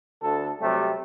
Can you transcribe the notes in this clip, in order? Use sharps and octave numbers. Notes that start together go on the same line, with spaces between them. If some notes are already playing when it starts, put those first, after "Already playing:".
D2 D3 A4
C3 F#3 G3 A3